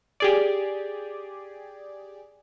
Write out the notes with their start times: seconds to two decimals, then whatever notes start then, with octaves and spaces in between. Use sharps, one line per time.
0.20 G4 G#4 D5